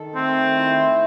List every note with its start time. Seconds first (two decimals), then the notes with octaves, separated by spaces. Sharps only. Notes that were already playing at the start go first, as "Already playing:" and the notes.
Already playing: D#3 A4
0.15 A3 C4
0.56 E4